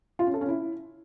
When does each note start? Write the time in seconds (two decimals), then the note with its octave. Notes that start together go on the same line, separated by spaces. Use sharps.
0.19 F4
0.27 C#4
0.34 A4
0.41 C#4
0.48 E4